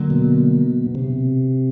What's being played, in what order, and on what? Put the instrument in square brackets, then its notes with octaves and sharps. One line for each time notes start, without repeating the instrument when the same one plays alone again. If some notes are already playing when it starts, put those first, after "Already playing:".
Already playing: [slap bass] D3 F#3 A#3
[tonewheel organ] B2
C3